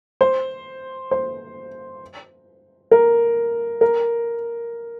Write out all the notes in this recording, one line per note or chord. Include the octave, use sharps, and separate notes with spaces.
C5
C5
A#4
A#4